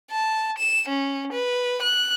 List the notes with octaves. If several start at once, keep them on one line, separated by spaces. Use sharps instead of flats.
A5
E7
C#4
B4
F#6